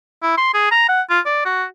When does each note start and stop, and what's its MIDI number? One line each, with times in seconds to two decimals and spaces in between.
0.22 0.35 64
0.37 0.51 84
0.54 0.71 68
0.71 0.86 82
0.89 1.01 78
1.10 1.20 65
1.26 1.42 74
1.45 1.64 66